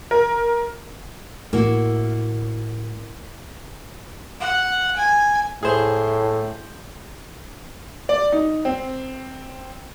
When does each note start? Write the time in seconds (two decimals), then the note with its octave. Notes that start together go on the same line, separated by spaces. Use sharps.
0.11 A#4
1.53 A2 A#3 E4 F#4
4.40 F#5
4.97 G#5
5.63 A2 G#4 C5
8.09 D5
8.32 D#4
8.65 C4